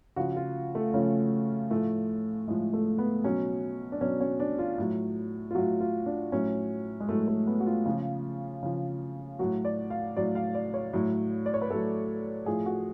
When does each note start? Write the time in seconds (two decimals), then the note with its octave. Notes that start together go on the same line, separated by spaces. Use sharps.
0.16 C#3 F3 F#4
0.36 F4
0.75 A3
0.94 C#3 F3 C#4
1.70 A2 F3 A3
2.47 A2 F3 G#3
2.73 A3
2.98 B3
3.24 B2 F#3 C#4
3.92 D4
4.01 B2 F#3 C#4
4.21 C#4
4.40 D4
4.59 F4
4.78 A2 F#3
5.51 F4
5.55 A2 F#3 F#4
5.80 F4
6.06 D4
6.32 A2 F#3 C#4
7.00 G#3
7.09 A2 F#3 A3
7.28 A3
7.47 B3
7.60 F#4
7.66 F4
7.86 C#3 F3
8.63 C#3 F3
9.39 A2 F#3 F#4
9.65 D5
9.90 F5
10.17 A2 F#3 D5
10.35 F5
10.55 D5
10.74 C#5
10.93 A2 F#3
11.46 D5
11.54 C#5
11.62 B4
11.70 A2 F#3 A4
12.46 A2 F3 G#4
12.66 F#4